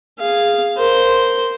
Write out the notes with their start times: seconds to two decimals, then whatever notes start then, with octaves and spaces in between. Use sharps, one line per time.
0.20 G#4 F5
0.78 A#4 C5